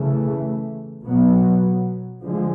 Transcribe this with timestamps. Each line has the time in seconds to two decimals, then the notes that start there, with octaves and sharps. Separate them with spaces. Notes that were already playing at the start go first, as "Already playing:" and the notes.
Already playing: C#3 E3 A3
1.05 B2 F#3 B3
2.22 D3 F3 G#3